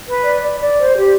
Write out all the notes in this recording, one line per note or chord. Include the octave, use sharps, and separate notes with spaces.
B4
D5
D5
D5
C5
G4